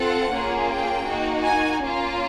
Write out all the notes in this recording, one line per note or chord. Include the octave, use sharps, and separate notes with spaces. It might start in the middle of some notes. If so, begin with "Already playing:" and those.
Already playing: C4 F4 A4 F#5
A#3 C#4 F4 G#4
G5
A#3 D#4 F#4
G#5
A#3 C#4 F4